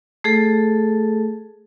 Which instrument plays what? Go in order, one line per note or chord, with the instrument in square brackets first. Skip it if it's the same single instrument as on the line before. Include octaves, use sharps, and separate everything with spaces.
[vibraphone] A3 G#4 A4